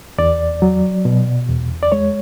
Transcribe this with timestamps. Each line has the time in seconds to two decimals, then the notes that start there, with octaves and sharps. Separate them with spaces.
0.18 E2 D5
0.62 F#3
1.05 B2
1.49 E2
1.83 D5
1.92 G#3 C#5